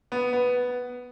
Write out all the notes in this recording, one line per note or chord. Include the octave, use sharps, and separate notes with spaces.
B3
B3